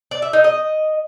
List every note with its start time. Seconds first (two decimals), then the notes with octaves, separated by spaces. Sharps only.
0.11 D5
0.22 E5
0.33 D#4
0.44 D#5